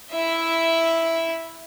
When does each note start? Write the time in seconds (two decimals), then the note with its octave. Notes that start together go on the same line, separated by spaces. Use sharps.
0.10 E4 E5